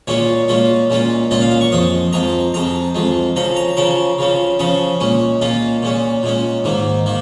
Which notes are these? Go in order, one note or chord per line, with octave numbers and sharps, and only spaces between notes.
A#2 G#3 C#4 F4 C#5
A#2 G#3 C#4 F4
A#2 G#3 C#4 F4
A#2 G#3 C#4 F4 D#5
F5
F5
C#6
F2 F3 G#3 D#6
F2 F3 G#3 A#5
F2 F3 G#3 A#5
F2 F3 G#3
C#3 F3 C#4 A#5
A#5
C#3 F3 C#4 A#4
C#3 F3 C#4
C#3 F3 C#4 G#4
A#2 G#3 C#4
A#2 G#3 C#4 F4
A#2 G#3 C#4
A#2 G#3 C#4
G#2 D#3 A#3
D#3 A#3